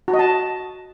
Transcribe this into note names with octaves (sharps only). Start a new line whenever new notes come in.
F#4
D#5
A5